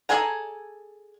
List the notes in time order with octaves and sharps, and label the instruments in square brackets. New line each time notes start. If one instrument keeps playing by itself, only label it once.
[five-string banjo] G#4 A4 D5 G#5 A#5